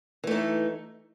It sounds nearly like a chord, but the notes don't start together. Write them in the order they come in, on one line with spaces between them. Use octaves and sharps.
E3 A3 D#4